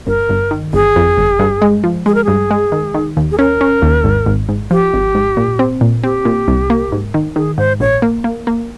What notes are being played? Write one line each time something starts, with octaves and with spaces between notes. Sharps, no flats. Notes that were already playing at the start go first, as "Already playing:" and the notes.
G1 A#4
G1
D#3
G1 G#4
F2
G1
G2
G#3
F3
G#3 G#4
A#4
G2 G#4
G#3
D#3
D#3
D#2
G#4
C#4 A#4
C#4
D#2
G#1
G#1
G#2
F3 G4
G#1
G#2
A#2
C4
A#2
C4 G4
A#2
C2
A#3
G#2
D#3
D#3 G#4
G#2 C5
A#1 C#5
A#3
A#3
A#3